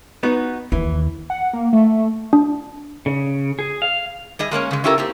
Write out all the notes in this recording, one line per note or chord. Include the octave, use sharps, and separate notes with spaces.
B3 D#4 F#4
D#2 E3
F#5
A#3
A3
D4
C#3
G#4
F5
G3 G#4 D#5
G#3 A#3 C#4 C#5
C#3 G#3
C#4 E4 F4 G4 A4 A#4
A#3 C4 G4